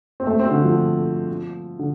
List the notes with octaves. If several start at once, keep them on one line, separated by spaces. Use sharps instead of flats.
C4
A3
C4
D3
F3
D3